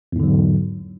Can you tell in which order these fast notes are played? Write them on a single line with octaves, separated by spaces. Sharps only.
E2 G#2 D3 F#3